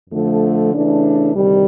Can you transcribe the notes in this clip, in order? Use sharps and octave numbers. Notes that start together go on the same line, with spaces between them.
F2 D3 F3 A3
C#3 E3 A3 D4
D2 C3 D#3 G3